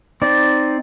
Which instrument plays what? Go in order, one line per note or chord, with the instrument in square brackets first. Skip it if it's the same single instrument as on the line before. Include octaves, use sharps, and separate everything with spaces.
[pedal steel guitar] C4 D#4 D5